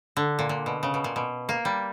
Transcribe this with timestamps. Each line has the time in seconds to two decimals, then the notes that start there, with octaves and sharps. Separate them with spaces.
0.17 D3
0.39 A#2
0.49 A#2
0.66 B2
0.83 C#3
0.94 B2
1.04 A#2
1.16 B2
1.49 A#3
1.65 G3